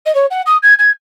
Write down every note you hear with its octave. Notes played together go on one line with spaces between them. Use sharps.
D#5
C#5
F#5
D#6
G#6
G#6